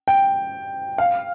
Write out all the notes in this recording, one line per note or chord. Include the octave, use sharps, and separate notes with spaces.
G5
F5